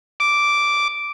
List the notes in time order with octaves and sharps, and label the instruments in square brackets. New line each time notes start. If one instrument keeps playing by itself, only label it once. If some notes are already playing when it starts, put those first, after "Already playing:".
[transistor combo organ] D6